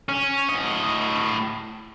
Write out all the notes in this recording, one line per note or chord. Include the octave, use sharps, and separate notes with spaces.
C#4
A2 D#5